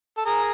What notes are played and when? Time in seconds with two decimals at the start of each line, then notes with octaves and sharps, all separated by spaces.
0.18 A4
0.25 G#4 A#4